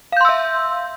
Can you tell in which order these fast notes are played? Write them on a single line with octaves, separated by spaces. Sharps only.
F5 G6 C6 E6 E5